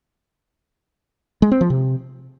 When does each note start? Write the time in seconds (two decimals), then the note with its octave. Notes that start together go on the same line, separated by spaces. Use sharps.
1.42 G#3
1.52 C4
1.61 F3
1.70 C3